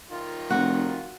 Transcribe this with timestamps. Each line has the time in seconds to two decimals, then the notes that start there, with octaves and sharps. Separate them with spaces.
0.10 D#3 F4
0.50 F1 F#4